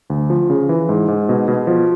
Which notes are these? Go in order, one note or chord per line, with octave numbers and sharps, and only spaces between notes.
D2
F3
C#3
E3
G#2
G#2
B2
B2
F3